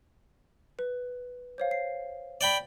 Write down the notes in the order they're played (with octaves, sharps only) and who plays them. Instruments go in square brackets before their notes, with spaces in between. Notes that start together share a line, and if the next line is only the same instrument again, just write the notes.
[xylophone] B4
C5 C#5 F5
C7
[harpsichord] D5 G5 B5